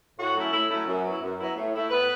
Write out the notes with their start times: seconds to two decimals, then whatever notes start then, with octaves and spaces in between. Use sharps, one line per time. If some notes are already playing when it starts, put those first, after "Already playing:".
0.18 A2 F#4
0.34 F#3 A3 C#4 E4
0.52 A2 E4
0.69 F#3 A3 C#4 E4
0.86 F#2
1.03 F#3 B3 E4
1.20 F#2
1.38 F#3 B3 E4
1.55 A2
1.74 A3 E4
1.90 A2 B3 B4